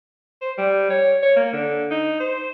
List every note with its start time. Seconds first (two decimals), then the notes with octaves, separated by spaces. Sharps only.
0.42 C5
0.58 G3
0.90 C#5
1.23 C#5
1.36 A#3
1.53 D3
1.91 D#4
2.20 C5